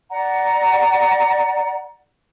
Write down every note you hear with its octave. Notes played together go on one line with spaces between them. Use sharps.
D5 F#5 A#5